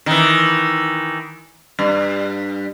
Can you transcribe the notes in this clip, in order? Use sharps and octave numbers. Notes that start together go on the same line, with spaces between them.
D#3 E3
G2